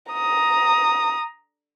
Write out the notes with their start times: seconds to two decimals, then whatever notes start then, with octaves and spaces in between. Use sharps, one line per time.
0.12 A#5 D#6